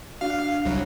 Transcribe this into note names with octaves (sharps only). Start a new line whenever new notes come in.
D4 F#4 F5
C2 F#3